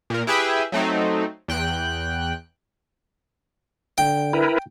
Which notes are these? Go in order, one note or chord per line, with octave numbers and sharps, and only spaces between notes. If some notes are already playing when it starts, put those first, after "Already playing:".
A#2 A#4
E4 G4 G#4 B4 E5 G5
F#3 A3 C4 D#4
E2 G5 F#6
D3 G5
E4 A#4 B4